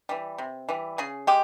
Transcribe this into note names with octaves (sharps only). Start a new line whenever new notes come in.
E3 G3
C3
E3 G3
C#3 G#4
G#3 G4